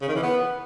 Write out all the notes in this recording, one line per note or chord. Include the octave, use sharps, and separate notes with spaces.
C#3
D#3
E3
B3